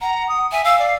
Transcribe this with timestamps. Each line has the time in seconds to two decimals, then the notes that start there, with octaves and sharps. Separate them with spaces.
0.01 F#5 A#5
0.28 D#6
0.52 E5 G#5
0.64 F5 E6
0.79 D5